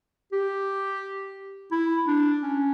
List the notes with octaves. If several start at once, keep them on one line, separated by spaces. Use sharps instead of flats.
G4
E4
D4
C#4